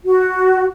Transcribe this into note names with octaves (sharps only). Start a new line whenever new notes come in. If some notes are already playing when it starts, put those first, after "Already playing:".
F#4